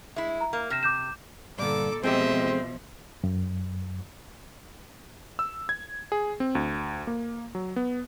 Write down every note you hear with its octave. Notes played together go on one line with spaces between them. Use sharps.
G#3 E4 E5
A#5
A#3
C3 F6 A#6 E7
D6 G6 E7
G2 A#2 D3 A4 D6
B2 F3 G#3 A3 C4 G4 D#5 E5
F#2
E6
G#6
G#4
C4
D2
A#3
F#3
B3